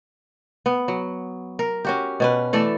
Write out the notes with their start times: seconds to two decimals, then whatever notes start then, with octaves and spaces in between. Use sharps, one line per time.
0.66 B3
0.88 F#3
1.59 A#4
1.85 C#4 F#4 G4
2.20 B2 C#4 B4
2.53 E3 A3 A4 D5